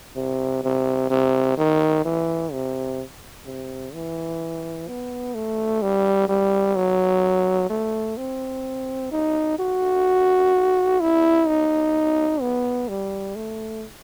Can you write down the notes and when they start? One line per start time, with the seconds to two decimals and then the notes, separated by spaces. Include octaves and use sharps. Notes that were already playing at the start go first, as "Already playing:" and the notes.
0.16 C3
0.64 C3
1.11 C3
1.58 D#3
2.05 E3
2.53 C3
3.46 C3
3.94 E3
4.88 B3
5.35 A3
5.82 G3
6.29 G3
6.76 F#3
7.70 A3
8.17 C4
9.12 D#4
9.59 F#4
11.01 E4
11.47 D#4
12.41 B3
12.88 G3
13.36 A3